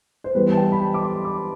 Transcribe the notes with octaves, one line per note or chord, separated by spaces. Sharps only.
C5
E3 G3 B3 E4 B4
A5
G5
B5
A5
D6
C6
D6